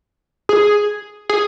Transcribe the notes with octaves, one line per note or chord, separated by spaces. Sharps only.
G#4
G#4